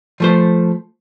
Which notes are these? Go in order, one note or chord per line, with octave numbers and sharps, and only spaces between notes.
F3 A3 C5